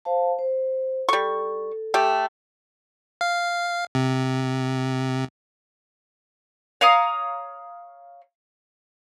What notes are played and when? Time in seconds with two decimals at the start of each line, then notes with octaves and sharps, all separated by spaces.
0.05 C5 F5 A5
0.39 C5
1.09 G3 A4 C#6
1.94 A3 G4
3.21 F5
3.95 C3
6.81 C#5 F5 A#5 D#6